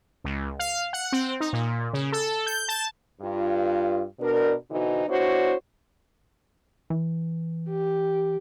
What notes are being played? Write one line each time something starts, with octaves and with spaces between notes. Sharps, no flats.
C#2
F5
F#5
C4
D#4
A#2
C#3
A4
G6
A5
G2 F4
B2 D4 A#4
B2 D3 E3 D#4 F#4 C5
B3 D4 E4 F#4 C5 C#5
E3
G4